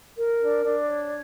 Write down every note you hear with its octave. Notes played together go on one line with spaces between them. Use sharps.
A#4
D4
D4
C#5